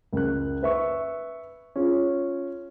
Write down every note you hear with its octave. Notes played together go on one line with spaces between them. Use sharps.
C#2 A#4 F#6
B4 E5 C#6
C#4 F4 G#4